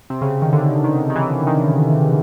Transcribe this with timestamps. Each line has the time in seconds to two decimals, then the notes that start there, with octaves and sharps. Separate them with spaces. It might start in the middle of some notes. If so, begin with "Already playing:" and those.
0.10 C3
0.21 C#3
0.42 D#3
0.53 D3
0.84 D#3
1.10 D#3
1.16 E3
1.47 D#3